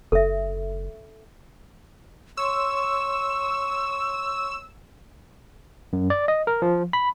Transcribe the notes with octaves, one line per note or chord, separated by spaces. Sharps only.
F#1 A4 E5
C#5 C6 C#6 E6
F#2
D5
D#5
A#4
F3
B5